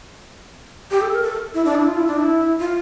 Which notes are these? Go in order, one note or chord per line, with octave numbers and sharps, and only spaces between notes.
G4
A4
A#4
A4
E4
D4
E4
F4
E4
D4
E4
F4